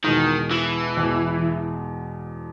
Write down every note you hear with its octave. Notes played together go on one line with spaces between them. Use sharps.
E2 B2 D#3 G#3
E3
E2 B2 G#3